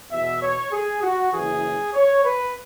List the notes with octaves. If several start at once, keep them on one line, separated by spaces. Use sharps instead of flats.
E2 B2 E5
C#5
G#4
F#4
F#1 F#2 E3 G#4
C#5
B4